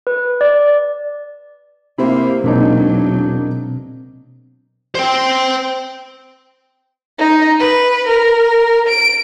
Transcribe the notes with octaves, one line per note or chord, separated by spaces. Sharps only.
B4
D5
C3 A#3 E4 C5
E1 B2 F#3 A#3 C4 D4 D#4
C5 G5
D#4
B4
A#4
D7